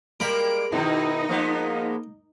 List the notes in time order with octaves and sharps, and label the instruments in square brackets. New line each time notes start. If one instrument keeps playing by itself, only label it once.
[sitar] G3 G#3 A#3 [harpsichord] A#4 B5 [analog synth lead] D7
[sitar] B2 D#3 [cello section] D#4 [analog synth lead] E4
[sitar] F3 G#3 B3 [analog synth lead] A#3